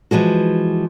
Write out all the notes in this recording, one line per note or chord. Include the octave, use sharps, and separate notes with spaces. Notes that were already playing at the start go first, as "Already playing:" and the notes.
E3 F3 G#3 F#4